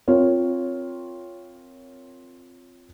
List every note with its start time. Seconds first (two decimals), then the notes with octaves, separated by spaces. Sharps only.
0.08 C4 F4 A#4 C#5